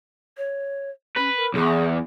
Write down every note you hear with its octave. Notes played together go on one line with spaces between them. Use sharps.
C#5
C#4 B4
A#4
B1 E2 G#4